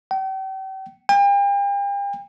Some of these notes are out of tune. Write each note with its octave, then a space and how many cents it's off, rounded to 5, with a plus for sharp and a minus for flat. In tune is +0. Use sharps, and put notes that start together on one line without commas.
G5 -40
G5 +40